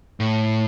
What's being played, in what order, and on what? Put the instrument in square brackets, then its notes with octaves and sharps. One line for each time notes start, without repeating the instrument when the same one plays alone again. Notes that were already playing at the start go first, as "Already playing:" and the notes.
[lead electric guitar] A2